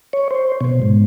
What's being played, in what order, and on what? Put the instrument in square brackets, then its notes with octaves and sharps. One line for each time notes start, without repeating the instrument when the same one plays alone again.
[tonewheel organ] C#5
C5
B2
G#2